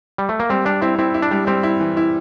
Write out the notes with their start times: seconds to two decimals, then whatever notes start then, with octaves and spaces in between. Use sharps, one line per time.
0.18 G3
0.29 A3
0.40 A#3
0.49 G3 C4
0.65 G3 D4
0.82 C4 E4
0.99 C4 E4
1.14 E4
1.22 D4
1.31 G3
1.47 G3 C4
1.63 E4
1.80 E3
1.97 E4